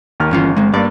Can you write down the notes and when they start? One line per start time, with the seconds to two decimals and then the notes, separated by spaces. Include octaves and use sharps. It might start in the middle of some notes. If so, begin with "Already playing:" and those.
0.20 D#2 D#3 F6
0.31 G1 E3 C#4 F4
0.57 G#3 C4
0.74 G2 A#3 D5